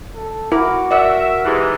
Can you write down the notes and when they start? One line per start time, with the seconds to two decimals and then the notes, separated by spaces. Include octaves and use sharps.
0.15 A4
0.52 E4 F#4 A#4 D6
0.91 A#4 D5 E5 F#5
1.45 G#2 E3 G4